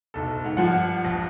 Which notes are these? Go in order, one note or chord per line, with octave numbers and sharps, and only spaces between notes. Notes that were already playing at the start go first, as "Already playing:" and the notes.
F#1 B1 A4
G#2 F#5
G1 F3 F4 F#5
A#1 F4